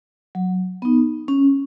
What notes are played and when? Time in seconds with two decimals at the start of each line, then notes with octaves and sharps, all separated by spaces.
0.35 F#3
0.82 B3 D#4
1.28 C#4